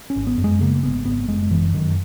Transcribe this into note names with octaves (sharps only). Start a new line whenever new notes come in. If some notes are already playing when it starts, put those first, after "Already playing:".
C#4
G#1
B3
F#2
G#3
C#3 A#3
G#1 B3
G#1 B3
F#1 G#3
F#1 E3
F#2 D#3